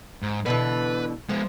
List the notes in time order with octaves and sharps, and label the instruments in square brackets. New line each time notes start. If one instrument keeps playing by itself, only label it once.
[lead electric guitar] G#2
[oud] B2 D3 E3 [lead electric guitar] B4
[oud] F3 [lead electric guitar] G#3 B3